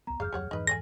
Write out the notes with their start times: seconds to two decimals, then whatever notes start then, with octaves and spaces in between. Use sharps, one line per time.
0.07 C#2 B3 A#5
0.20 G1 E2 G2 G#4 F5 F6 G6
0.33 D1 F2 F#3 G4 C#5 F#5
0.51 F2 G#2 E3 D#4 B4
0.67 A4 D5 G#5 A#6